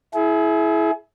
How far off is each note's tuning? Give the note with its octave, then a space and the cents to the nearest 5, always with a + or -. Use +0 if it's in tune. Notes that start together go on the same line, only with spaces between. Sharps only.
E4 +0 G#4 +35